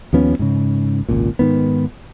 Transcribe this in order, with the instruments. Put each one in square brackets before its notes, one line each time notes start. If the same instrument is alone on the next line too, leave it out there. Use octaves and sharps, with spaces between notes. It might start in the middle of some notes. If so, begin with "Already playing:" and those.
[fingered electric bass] D#2 F3 B3 C#4
G#2 C#3
G#1 C#2 A#2
G#2 D#3 B3